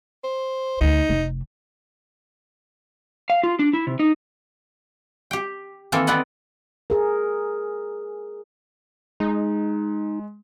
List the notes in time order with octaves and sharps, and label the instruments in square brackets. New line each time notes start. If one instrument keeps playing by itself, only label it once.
[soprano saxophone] C5
[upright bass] D2 [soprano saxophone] D#4
[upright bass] F1
[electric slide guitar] F5
F4
D4
E4
C3
D#4
[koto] G4 G5
D#3 E3 A#3 C4 A4
B3 C4 B4 D5 D#5
[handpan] G#4 A#4
[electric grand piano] G#3 [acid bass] D#4